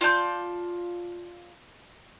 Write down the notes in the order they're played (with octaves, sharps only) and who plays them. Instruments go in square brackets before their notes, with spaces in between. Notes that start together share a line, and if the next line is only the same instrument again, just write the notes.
[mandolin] F4 D5 A5 G6